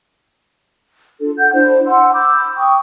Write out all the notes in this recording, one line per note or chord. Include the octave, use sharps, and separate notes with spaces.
D4 F4 A4
F#5 G6
D4 E4 C5 D5
F#5 C6 E6
B5 D6 E6 G6
G5 C#6 D#6